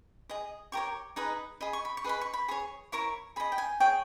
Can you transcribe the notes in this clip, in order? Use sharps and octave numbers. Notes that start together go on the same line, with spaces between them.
G#4 D#5
G4 A#4 C#5 C#6
D#4 G#4 B4 D#5
G#4 D#5 B5
C#6
B5
C#6
G#4 B4 D#5 B5
C#6
B5
G#4 C#5 C#6
E4 A#4 C#5 C#6
G#4 D#5 B5
G5
G#5
G#4 C#5 G5